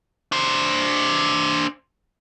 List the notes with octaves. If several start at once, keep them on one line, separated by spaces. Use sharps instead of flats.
D4 C5